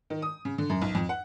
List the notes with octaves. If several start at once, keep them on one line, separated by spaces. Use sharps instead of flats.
D#3
D#6
C#3
D3
F#2
B1
F2
F#5